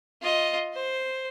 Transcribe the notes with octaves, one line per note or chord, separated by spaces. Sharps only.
F4 D#5
C5